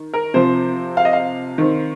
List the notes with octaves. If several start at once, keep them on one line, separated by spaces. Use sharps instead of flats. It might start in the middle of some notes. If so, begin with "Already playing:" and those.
Already playing: D#3
A#4
C3 F3 C4 C5
F5
D#5
F5
D#3 C4